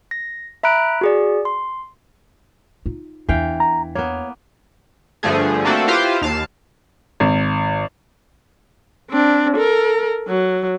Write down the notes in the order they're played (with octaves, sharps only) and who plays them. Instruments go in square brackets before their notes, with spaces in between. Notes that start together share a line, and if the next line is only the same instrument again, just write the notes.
[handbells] A#6
E5 A#5 B5 F#6 D7
F#4 G#4 D5
C6
[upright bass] D#4 F4
[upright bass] E2 D4 [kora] E3 F5 G5
[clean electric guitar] A#5
[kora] A#3 B3 [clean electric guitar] C#5
[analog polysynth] G2 D3 F3 A3 G#4
A3 A#3 C4 D4 F#4 A4
E4 F4 G4 B4 C5 F5
D#2 F5 A5
[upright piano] G#1
[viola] C4 D4
A4 A#4
F#3